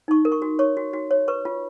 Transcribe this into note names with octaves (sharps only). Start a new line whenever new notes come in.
D#4 C#6
A#4
C#6
F#4
C#5 C#6
F#4
F#4
C#5
B4 C#6
F4